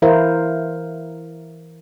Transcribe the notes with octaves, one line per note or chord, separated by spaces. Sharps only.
E3 E4 A#4 C5 F5